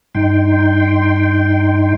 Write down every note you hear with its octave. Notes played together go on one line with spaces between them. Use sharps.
G2 D#4 G5 C6